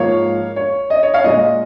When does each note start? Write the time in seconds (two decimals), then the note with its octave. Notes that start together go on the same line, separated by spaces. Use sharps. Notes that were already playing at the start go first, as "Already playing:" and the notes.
Already playing: G#2 F3 A#3 C#5 F5
0.56 C#5
0.90 D#5
1.03 C#5
1.14 C#5 F5
1.24 A#2 G#3 D#5